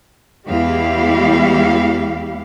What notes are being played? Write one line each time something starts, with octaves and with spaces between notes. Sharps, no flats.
E2 G#3 E4 G4 F5